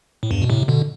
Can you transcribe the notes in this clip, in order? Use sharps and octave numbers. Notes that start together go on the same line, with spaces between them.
A2
E2 G2
B2
A2 C3
B2 D3